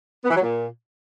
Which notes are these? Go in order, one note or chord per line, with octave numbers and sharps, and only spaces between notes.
B3
E3
F#3
A#2